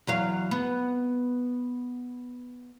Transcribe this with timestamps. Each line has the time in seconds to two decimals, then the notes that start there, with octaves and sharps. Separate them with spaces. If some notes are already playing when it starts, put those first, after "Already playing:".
0.07 E2 F#3 F5
0.51 B3